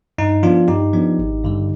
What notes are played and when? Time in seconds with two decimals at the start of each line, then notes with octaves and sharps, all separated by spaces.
0.18 G2 D#4
0.43 F3 B3 D4 F4
0.68 G2 D#4 G4
0.93 F3 B3 D4
1.19 G#1
1.44 G2 D3 G3